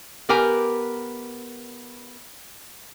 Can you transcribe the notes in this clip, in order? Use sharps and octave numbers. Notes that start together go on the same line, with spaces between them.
B3 G4 A#4 G#5